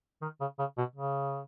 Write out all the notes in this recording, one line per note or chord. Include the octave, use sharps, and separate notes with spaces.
D#3
C#3
C#3
B2
C#3